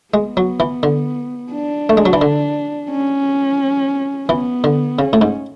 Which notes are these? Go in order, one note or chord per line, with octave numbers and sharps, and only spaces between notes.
G#3 B3
F#3
E3
D3
D4
A3
G#3
F#3
E3
D3
C#4
E3 B3
D3
C#3 C#4
A2
G#2